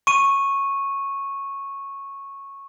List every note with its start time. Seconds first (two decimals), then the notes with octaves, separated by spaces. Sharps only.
0.07 C#6 D#7